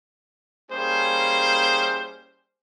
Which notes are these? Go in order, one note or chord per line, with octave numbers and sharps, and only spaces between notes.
G3 A#3 C#4 E4 G#4 C5